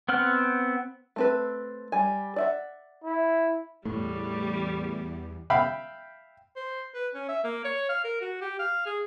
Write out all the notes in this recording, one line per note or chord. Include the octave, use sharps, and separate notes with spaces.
B3 C4 F#5 F6
A3 C4 B4
G3 G#5
D5 E5 F#5
E4
E2 A2 G3 A3
E5 F5 G5 B5
C5
B4
C#4
E5
A#3
C#5
F5
A#4
F#4
G4
F5
G#4